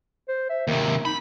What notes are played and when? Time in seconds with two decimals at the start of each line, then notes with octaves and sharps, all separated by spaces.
0.29 C5
0.50 E5
0.68 D#2 C3 A#4
1.05 D#4 B5